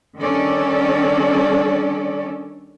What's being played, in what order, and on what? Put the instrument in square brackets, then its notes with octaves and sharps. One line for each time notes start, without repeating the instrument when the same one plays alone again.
[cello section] D#3 G3 C#4 D4 A4 D5